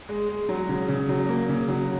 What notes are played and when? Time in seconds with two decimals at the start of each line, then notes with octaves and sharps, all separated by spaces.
0.09 G#3
0.29 G#3
0.49 F#3
0.69 C#3
0.88 C#3
1.09 F#3
1.29 A#3
1.49 C#3
1.68 F#3